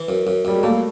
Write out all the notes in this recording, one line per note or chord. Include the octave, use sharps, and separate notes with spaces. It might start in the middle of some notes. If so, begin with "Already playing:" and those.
Already playing: E3
F#2
F#2
F#2 G3
G#3
G3 A3 A#3